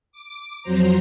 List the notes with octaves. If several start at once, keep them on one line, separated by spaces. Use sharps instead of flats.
D6
F2 F#3 C5 A#5